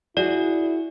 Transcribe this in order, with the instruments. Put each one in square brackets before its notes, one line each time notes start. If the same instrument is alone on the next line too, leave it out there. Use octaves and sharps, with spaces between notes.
[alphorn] E4 [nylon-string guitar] F#4 G#4 [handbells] D5